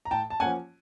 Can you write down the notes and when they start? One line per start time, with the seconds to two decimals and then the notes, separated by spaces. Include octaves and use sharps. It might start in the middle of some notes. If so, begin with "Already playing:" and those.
0.05 A#5
0.11 A2 G5 A5
0.30 A5
0.40 F3 A#3 C#4 F#5 G#5